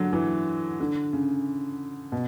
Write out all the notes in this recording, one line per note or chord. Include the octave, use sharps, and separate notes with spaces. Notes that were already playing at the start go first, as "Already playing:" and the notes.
Already playing: D3 F#3
E3
D3
C#3
B2